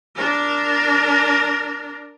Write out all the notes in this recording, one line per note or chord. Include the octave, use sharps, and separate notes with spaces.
D4 A#4